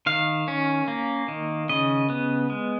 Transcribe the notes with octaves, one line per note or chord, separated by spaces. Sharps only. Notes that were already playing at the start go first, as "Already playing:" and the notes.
D#3 F5
C#4
A#3
D#3
C#3 D#5
B3
G#3